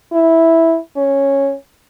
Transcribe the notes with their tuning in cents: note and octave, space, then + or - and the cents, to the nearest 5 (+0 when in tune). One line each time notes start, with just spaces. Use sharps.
E4 -5
C#4 -5